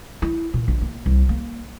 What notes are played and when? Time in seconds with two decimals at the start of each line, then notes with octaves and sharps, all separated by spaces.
0.22 E4
0.54 A#2
0.68 A#1
0.81 A#3
1.06 C2
1.29 A#3